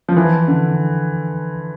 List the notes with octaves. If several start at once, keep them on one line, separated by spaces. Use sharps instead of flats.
F3
E3
D3